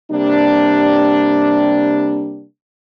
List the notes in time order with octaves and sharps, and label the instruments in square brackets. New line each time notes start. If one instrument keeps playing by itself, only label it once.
[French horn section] C3 G3 A#3 D4